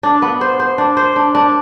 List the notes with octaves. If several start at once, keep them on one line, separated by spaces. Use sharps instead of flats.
D4
B3
C5
C5
D4
C5
D4
D4